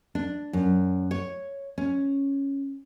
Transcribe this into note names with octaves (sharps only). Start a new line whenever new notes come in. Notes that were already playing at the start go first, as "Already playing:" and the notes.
D4
F#2
C#5
C#4